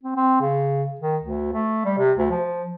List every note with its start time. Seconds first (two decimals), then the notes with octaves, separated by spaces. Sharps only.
0.03 C4
0.16 C4
0.41 C#3
1.00 D#3
1.23 D2
1.53 A3
1.85 G3
1.98 C3
2.18 D2
2.31 F3